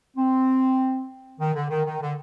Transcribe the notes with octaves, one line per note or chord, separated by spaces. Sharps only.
C4
D#3
D3
D#3
D#3
D3